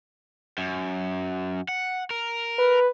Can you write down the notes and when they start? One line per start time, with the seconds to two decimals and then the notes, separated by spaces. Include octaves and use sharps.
0.58 F#2
1.69 F#5
2.11 A#4
2.59 B4